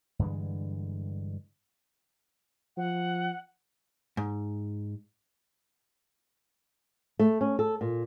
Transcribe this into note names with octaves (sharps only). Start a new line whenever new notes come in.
G2 D3 E3 G#3
F3 F#5
G#2
A3
C#4
A4
A#2